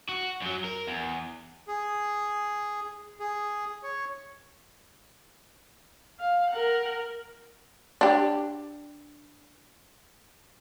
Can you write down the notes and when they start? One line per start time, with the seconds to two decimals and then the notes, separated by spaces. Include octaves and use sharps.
0.09 F#4
0.42 F#2 F#3
0.64 A#4
0.87 E2
1.68 G#4
3.20 G#4
3.83 C#5
6.20 F5
6.50 A#4 F#5
8.01 D4 G4